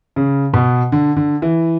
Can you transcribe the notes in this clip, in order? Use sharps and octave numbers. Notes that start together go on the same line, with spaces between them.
C#3
B2
D3
D3
E3